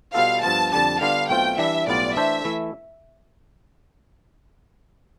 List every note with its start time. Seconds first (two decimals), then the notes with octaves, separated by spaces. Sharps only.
0.14 B2 G3 B3 F4 A4 F5
0.43 G2 F3 B3 F4 A5
0.72 F2 D3 G3 D4 A5
1.00 D3 G3 B3 D4 F4 F5
1.29 B1 B2 A3 C4 F4 G5
1.58 E3 G3 D4 E5
1.87 B1 A2 G3 B3 F4 D5
2.16 E3 A3 D4 A4 C5 E5
2.45 E3 A3 E4